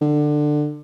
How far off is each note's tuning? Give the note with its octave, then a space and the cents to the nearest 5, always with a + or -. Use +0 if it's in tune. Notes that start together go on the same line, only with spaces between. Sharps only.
D3 +20